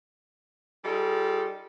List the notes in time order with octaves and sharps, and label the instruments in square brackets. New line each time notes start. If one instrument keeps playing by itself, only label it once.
[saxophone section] G3 D#4 F4 G#4 A4